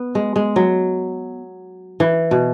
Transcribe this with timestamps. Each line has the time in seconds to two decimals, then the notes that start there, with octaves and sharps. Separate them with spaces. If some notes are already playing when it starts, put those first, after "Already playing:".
Already playing: B3
0.15 G#3
0.36 G#3
0.56 F#3
2.00 E3
2.31 B2